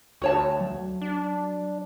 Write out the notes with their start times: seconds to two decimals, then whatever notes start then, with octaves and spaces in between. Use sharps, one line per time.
0.22 D2 F#4 C#5 A5
0.61 F#3
1.02 D4